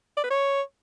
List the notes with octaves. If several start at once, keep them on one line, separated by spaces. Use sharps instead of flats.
D5
B4
C#5